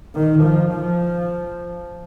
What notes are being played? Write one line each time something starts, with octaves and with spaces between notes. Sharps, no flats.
D#3
F3
F3